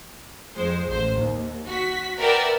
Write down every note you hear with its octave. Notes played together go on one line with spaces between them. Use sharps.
F2 G#3 C5
A1 C5
D#2
F#4 B6
A#4 B4 D5 E5 F#5 G5